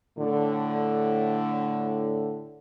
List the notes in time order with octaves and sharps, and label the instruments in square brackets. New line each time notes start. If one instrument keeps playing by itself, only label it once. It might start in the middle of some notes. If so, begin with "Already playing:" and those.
[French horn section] A2 D3